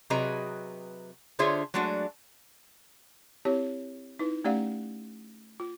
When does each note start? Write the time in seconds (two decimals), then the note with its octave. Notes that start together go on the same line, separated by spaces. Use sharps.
0.10 C3 F#3 G#4 B4 D#5 A#5
1.39 D3 F4 G#4 C5 C#5 E5
1.74 F#3 G#3 A3 D4 F#4
3.45 C4 E4 G4 C#5
4.19 D#4 E4 B4
4.45 A3 C#4 G4 D5 F5 F#5
5.60 F4